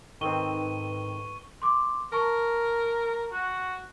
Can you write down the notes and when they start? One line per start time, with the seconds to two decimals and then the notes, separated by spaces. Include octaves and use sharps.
0.21 G#2 D#3 C4 A4 B4 C#6 D#7 G7
1.62 C6 D6
2.12 A#4 A5 C#6
3.33 F#4